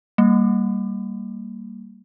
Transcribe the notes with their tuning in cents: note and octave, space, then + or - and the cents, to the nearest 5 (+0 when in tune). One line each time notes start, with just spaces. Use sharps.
G3 +0 A#3 -10